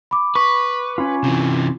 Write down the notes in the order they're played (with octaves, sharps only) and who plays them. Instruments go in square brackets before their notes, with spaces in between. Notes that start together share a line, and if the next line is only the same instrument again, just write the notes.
[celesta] B5 D6
[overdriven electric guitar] B4 [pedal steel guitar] C#6
[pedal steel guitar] C#4 F4
[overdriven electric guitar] C3 E3